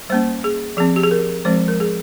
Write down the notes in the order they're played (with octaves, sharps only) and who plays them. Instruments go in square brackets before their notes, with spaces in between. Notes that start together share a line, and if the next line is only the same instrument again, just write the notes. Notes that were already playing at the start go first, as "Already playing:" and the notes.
[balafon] G3 A#3 C#4 C5
G#4
F3 C4 G#4
G4
G#4
A#4
F3 G#3 C4 C5
A#4
G#4